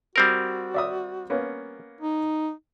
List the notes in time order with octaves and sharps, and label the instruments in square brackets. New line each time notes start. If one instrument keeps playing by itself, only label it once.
[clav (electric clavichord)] G3 C4 A#4 [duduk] F#4
[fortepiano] D5 E5 D#6
A#3 B3 C#4
[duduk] D#4